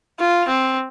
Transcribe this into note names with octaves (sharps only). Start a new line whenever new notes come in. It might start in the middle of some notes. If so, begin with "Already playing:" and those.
F4
C4